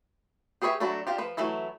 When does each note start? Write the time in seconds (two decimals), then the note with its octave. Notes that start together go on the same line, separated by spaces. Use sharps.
0.62 G4 G#4 B4 C#5 E5
0.80 F#3 A3 D4 F#4 B5
1.07 D4 F4 G4
1.18 F3 B4
1.37 E3 F#3 A3 E4